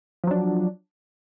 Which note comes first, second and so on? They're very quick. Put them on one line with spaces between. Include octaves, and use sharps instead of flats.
F3 F#3 D4